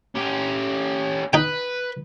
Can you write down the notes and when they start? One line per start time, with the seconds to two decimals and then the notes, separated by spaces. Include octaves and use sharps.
0.15 C#4 G4
1.33 D#4 B4 G5